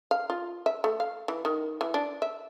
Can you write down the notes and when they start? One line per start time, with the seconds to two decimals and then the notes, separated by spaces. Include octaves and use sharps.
0.11 F5
0.30 F4
0.66 E5
0.84 A3
1.00 F5
1.28 E3
1.45 D#3
1.81 E3
1.94 D4
2.22 E5